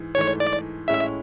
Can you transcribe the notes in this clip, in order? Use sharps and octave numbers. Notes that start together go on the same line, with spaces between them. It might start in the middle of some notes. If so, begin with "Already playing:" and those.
Already playing: G#2 E3
G#2 E3 A3 C#5
D5
A2 G#3 C#4 E4 E5